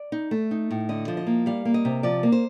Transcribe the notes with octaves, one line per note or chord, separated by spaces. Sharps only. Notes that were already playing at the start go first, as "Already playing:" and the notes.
Already playing: D5
D#4
A3
D#4
A2
D3 D#5
F3
D#5
A#3
G3 F5
A#3
D#5
C3
F3 D5
A#3
C5